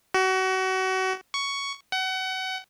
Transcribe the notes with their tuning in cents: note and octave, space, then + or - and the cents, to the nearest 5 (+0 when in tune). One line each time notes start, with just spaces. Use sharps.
F#4 +30
C#6 +10
F#5 +30